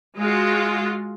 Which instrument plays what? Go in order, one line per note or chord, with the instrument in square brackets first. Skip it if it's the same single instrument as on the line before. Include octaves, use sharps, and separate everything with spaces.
[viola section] G#3 F4 F#4